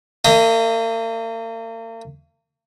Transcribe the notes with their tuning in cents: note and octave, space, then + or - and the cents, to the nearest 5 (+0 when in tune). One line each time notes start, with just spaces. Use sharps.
A#3 -45 D#5 +0